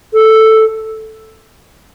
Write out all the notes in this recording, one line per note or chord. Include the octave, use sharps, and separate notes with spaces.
A4